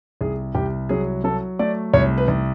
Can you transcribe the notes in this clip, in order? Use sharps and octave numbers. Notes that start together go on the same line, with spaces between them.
C2 G#4
C2 G4
F#3 G#4
F#3 A4
A3 D5
C2 C#5
B4
C2